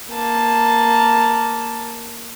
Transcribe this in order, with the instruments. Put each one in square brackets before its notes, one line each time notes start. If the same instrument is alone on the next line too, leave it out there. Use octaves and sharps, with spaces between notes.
[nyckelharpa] A#3 A5